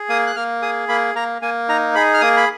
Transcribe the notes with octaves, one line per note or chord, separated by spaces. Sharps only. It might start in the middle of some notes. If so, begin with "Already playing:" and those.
Already playing: G#4
A#3 D#6
F#6
A#3 F6
G#4 D#6
A#3 B5
A#3 A#5
A#3 G#5
D#4 A#5
G#4 B5
F6
A#3 D#6
B5